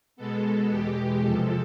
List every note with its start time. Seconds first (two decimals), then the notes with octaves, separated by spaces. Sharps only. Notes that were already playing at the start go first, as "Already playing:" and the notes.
0.16 B2 G#3 B3 A4
0.69 E2 B2 G#3 G4
1.22 F2 C3 F3 G#3 A4